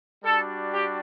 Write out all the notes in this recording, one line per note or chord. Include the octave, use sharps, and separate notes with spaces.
G3 D4 F#4 A4
G4